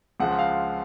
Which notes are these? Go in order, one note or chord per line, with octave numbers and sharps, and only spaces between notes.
C#2 C#3 F3 F#5
F5